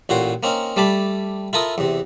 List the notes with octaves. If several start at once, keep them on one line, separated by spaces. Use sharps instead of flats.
A1 A#2 F#4 C#5 G5 C6
A#3 C4 C#4 D#4
G3 A3 D5 A5 B5
E4 F4 A4 A#4 D#6
E2 C3